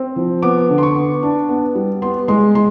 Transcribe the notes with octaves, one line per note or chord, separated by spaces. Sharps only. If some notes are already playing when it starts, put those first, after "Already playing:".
Already playing: C4
F3
B3 D6
D3
C6
C#6
B3
D4
B3
G3
B3 C6
G#3 C6
G#3 C6